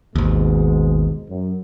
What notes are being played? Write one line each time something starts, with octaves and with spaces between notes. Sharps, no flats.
G#1 D#2 G#2 B2 G#3
F#2